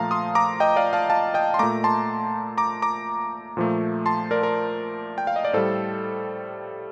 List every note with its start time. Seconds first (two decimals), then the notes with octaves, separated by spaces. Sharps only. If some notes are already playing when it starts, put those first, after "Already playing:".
Already playing: A#2 F3 A3 F5 A5 A#5
0.11 C6 D#6
0.35 A#5 D6
0.60 D#5 G5
0.76 D5 F5
0.93 F5 A5
1.10 F5 A5
1.34 D#5 G5
1.54 C6
1.59 A#2 A3 A#5 D6
1.84 A5 C6
2.58 A#5 D6
2.82 A#5 D6
3.57 A#2 F3 A3
4.06 A5 C6
4.31 A#4 D5
4.43 A#4
5.18 G5
5.27 F5
5.36 D#5
5.45 D5
5.53 A2 G3 A4 C5